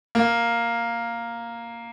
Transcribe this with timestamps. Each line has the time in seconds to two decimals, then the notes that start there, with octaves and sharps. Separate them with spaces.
0.15 A#3